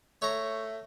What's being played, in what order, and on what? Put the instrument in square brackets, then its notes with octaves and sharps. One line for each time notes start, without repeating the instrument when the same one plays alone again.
[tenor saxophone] A3 [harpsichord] C#5 A#5